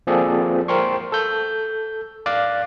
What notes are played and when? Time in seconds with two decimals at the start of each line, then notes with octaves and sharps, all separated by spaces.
0.07 F3 A#3 C4 G#4 A4 D5
0.68 A#4 C5 G5 C6 C#6
1.12 A4 G6
2.26 D5 F5 D6 F#6